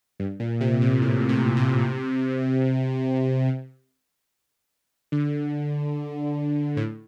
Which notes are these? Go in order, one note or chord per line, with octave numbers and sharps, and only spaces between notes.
G2
A#2
C3
A#2
A2
C3
C3
D3
A2